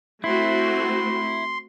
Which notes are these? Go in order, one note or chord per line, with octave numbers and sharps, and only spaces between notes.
A3 C4 E4 F#4 C6